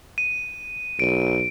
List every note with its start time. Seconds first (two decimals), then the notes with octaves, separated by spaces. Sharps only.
0.18 D#7
0.99 B1 D7